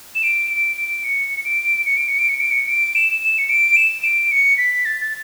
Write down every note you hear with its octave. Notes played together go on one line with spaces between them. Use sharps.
E7
D7
D7
D7
C#7
D7
C#7
D7
C#7
D7
C#7
D7
C#7
D7
E7
E7
C#7
D7
E7
D7
C#7
B6
A6
A6